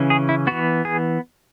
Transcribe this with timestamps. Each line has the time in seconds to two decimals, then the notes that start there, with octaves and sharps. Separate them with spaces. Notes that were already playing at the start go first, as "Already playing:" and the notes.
Already playing: C#3 E3 C#4
0.10 G#4
0.29 E4
0.47 E3 B3 F#4
0.85 G#4